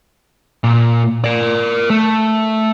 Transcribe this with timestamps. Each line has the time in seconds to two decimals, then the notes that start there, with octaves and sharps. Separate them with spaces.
0.64 A#2
1.24 A#4 D5
1.90 A3